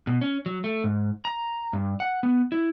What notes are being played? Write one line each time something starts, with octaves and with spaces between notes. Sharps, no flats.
B2
C#4
F#3
A3
G#2
A#5
G2
F#5
B3
E4